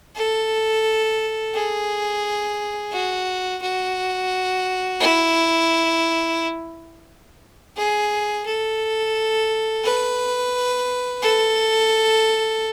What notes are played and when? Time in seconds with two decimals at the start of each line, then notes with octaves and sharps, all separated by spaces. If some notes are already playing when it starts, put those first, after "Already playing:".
0.16 A4
1.55 G#4
2.93 F#4
3.62 F#4
5.00 E4
7.77 G#4
8.46 A4
9.84 B4
11.22 A4